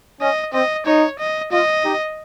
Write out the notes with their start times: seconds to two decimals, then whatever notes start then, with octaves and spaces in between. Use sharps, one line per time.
0.21 C#4 D#5
0.53 C4 D#5
0.86 D#4 C#5
1.19 D#5
1.52 F4 D#5
1.85 D#4 G4